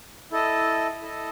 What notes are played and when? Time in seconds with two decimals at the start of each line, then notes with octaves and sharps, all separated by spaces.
0.31 E4 A4 D#5 A5
1.01 E4 A4 D#5 A5